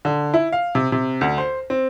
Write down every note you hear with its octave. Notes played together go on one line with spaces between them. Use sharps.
D3
E4
F5
C3
C3
D2
C5
C4